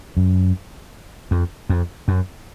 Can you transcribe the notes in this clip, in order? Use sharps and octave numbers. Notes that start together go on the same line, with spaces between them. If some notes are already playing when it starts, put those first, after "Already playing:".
F#2
F2
F2
F#2